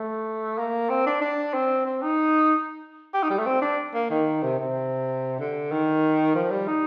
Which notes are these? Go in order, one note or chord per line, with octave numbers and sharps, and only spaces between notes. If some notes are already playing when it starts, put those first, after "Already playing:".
Already playing: A3
A#3
C4
D4
D4
C4
C4
D#4
G4
D#4
G3
A3
C4
D4
A#3
D#3
C3
C3
D3
D#3
F3
G3
D#4